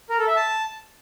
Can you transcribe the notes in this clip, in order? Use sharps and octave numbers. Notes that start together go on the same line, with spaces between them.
A#4
A4
E5
A5